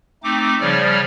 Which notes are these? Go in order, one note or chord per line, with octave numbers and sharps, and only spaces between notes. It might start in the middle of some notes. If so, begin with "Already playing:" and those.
A3 C4 D#4 D6
C#3 F3 G3 C#5 D5 F6